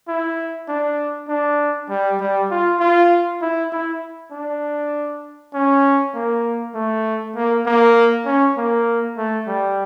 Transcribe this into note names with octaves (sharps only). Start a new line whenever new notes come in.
E4
D4
D4
G3
G3
F4
F4
E4
E4
D4
C#4
A#3
A3
A#3
A#3
C#4
A#3
A3
G3